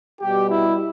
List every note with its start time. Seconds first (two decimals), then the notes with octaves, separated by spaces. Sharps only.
0.20 B2 G3 G4
0.48 E4